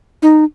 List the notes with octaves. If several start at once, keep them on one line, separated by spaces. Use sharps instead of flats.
D#4